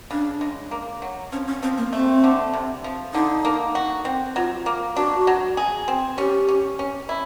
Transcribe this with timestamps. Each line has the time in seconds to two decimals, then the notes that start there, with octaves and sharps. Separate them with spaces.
0.11 C#3 D4
0.41 G#3
0.71 A#3
1.02 F#3
1.32 F3 C#4
1.47 C#4
1.63 F3 C4
1.78 A#3
1.93 A3 C4
2.24 D3
2.54 C3
2.84 F3
3.14 D3 D#4
3.45 A#3
3.75 F#4
4.05 C4
4.36 F#3 F4
4.66 A#3
4.96 D4 F#4
5.27 F#3
5.57 G#4
5.88 C4
6.18 C#4 G4
6.48 C#4
6.79 C#4
7.09 E4